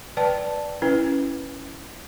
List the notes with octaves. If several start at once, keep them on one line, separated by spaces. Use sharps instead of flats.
B4 D5 G5 A5
C#4 E4 B4